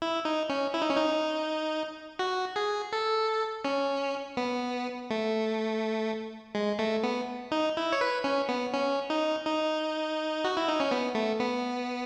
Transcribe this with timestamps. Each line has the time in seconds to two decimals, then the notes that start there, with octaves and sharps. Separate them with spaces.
0.02 E4
0.25 D#4
0.49 C#4
0.74 E4
0.82 D#4
0.90 C#4
0.96 D#4
2.19 F#4
2.56 G#4
2.93 A4
3.65 C#4
4.37 B3
5.10 A3
6.55 G#3
6.79 A3
7.03 B3
7.52 D#4
7.77 E4
7.92 C#5
8.01 B4
8.24 C#4
8.49 B3
8.74 C#4
9.10 D#4
9.45 D#4
10.44 F#4
10.57 E4
10.68 D#4
10.80 C#4
10.91 B3
11.15 A3
11.40 B3